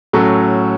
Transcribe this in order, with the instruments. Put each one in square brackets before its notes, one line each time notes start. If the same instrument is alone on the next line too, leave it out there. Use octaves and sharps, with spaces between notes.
[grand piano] A2 F#3 C#4 F#4 A4